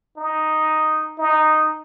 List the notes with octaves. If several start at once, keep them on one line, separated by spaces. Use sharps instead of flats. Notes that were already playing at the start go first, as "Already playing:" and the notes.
D#4
D#4